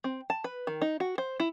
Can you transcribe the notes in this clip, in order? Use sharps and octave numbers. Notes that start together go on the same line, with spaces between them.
C4
A5
B4
D#3
D#4
F#4
C5
E4